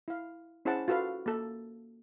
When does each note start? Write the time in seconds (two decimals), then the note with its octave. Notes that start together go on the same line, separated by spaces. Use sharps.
0.08 E4 F5
0.65 C#4 E4 G#4 C5 F#5 A5
0.88 F4 F#4 A4 B4 F5
1.26 A#3 A4